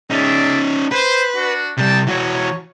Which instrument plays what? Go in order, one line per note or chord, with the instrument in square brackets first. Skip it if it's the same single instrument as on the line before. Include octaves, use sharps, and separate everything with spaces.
[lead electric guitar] C#4 D#4 [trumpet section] G#4 D5 E5
[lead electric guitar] B4 [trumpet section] C5
[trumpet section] D4 F#4
[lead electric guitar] C3 G3 [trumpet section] D5 G5 A5
[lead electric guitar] E3 F#4 [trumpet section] C#5